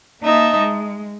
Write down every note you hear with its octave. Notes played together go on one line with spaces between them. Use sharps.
A#3 D#4 D#5 E5 A5
G#3